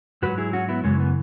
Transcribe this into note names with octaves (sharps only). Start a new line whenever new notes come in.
G#2 F#3 F#4 B4
E4 G#4
C#4 F#4
B3 E4
F#2 C#3 E3 G#3 C#4
B3